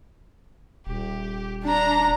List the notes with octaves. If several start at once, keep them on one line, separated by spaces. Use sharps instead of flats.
D#1 G4
D4 A#5